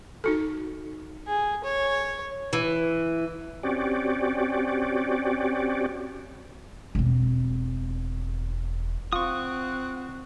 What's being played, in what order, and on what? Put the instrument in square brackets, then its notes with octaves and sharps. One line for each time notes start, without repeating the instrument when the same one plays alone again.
[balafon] D#4 F#4 A4
[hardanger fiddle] G#4
C#5
[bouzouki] E3
[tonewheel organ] C4 C#4 F#4 G4 D5
[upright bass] E1 C4
[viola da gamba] C4 [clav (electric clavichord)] F4 [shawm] F#5 [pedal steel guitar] C#6 D#6